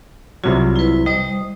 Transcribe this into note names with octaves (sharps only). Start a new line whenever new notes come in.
C2 C3 F#3 F4
E4 B4
G3 C5 D#5 D#6